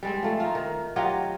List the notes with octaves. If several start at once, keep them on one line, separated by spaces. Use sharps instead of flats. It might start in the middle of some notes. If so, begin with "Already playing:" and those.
G3 G#3 C4
F3 A3
D#4 F4
D#3
F#3 F4 G4 D#5